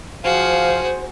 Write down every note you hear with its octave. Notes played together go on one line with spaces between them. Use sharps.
F3 F#4 G#4 C5 F5